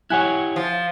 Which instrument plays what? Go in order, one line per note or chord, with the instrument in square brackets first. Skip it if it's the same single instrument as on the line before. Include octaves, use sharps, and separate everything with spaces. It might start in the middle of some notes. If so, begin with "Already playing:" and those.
[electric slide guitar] E4 G4 C#5 [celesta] F#5 G#5 F#6
[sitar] F3